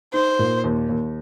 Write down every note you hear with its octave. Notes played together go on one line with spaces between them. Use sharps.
D#4 C5
A#2
D#2
D#2